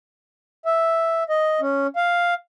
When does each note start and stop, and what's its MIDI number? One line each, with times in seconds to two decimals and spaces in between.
0.65 1.24 76
1.29 1.60 75
1.61 1.87 61
1.96 2.34 77